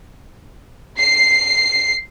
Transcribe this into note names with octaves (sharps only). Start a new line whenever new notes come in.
C7